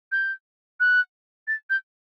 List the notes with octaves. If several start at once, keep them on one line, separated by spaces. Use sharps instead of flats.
G6
F#6
A6
G6